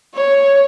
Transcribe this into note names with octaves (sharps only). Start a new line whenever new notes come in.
C#5